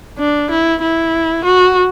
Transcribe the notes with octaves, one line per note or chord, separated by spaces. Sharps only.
D4
E4
E4
F#4